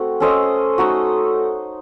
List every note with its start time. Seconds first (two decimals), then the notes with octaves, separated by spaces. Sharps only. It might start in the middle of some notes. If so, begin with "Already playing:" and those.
Already playing: A3 C4 F#4
0.20 C#4 A4 C5 D#5
0.78 A3 D#4 F#4